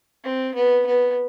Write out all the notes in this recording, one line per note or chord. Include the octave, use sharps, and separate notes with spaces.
C4
B3
B3